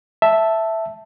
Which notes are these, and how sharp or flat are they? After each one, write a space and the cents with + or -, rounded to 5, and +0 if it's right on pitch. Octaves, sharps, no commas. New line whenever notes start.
E5 +0 A5 +0